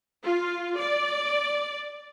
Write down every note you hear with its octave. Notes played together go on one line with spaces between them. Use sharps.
F4
D5